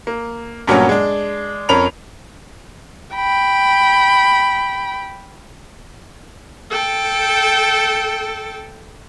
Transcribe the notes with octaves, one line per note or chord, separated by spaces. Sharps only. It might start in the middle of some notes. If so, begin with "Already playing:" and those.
A#3
G2 A#2 F#3 A#3 B3 C#4
G#3 D4
F2 C#4 A#4 B5 F7
G5 B5
A4 G5